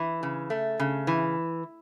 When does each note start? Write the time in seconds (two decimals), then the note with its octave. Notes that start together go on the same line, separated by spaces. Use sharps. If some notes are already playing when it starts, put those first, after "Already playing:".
Already playing: E3
0.23 C#3
0.50 A3
0.80 C#3
1.07 E3